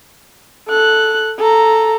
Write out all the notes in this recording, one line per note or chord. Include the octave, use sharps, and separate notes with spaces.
A4 F#6
A4 A#5